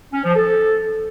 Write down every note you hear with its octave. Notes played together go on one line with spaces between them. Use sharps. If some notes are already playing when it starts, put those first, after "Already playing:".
C#4
F3
A4